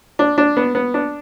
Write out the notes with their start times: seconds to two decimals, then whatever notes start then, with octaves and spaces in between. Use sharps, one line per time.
0.19 D4
0.38 D4
0.57 B3
0.75 B3
0.94 D4